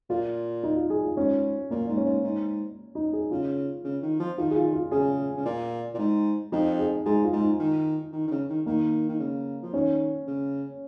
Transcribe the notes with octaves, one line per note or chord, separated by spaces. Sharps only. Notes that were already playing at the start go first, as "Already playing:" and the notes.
A#2 F4
D#4
F4
G#4
F4
G#2 C#4
A#2 A#3
G#2
C#4
G#2
G#2
D#4
G#4
C#3 F4
C#3
D#3
F3
D#3 F4
G#4
F4
F4
C#3 G#4
C#3
A#2
A#2
G#2
F2 D#4
G#4
G#2 G#4
F4
G#2
D#4
D#3
D#3
D#3
C#3
D#3
D#3 A#3
D#3
C#3
F3
D#3 C#4
C#3